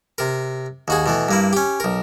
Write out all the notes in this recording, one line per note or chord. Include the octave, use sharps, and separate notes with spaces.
C3 A#4
D#2 F#4 G#4
B2 E3 A3
G2 A#3 E4
C#4 G4
B1 A#4